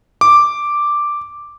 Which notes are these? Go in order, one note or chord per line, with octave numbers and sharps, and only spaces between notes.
D6